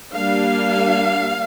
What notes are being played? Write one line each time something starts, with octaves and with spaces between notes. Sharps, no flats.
G3 A#3 D4 F5